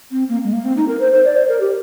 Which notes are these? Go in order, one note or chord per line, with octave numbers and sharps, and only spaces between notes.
C4
A#3
G#3
A#3
C4
D#4
A#4
C5
C5
D5
C5
A#4
G4